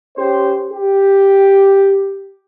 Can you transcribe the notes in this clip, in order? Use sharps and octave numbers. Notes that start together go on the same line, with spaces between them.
C#4 G4 C5
G4